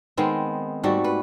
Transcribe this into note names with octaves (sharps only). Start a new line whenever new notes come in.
D#3 G#3 B3 C4
G#2 G3 A3 F#4
B4